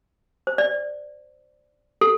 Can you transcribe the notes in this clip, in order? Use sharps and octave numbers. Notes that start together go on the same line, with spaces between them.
C5
D5
A4